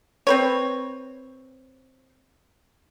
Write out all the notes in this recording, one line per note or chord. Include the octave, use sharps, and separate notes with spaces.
C4 B4 C#5